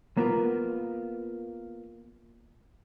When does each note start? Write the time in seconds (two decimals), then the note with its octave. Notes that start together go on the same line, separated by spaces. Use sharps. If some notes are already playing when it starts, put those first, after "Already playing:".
0.17 A#3 B3 F4 A#4